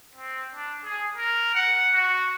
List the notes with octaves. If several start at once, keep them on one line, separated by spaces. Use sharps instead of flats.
C4
D4
G#4
A#4
F#5
F#4